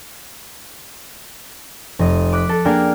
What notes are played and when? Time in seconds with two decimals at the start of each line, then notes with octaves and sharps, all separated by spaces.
1.99 F1 D#5
2.32 D6 F#6 B6
2.49 A4
2.65 A#3 D4 G#4 A#4 F5 G5